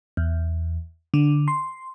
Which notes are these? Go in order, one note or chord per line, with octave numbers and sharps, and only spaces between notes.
E2
D3
C6